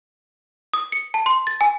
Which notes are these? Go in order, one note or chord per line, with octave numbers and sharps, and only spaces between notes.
D#6
C#7
A5
C6
A6
G#5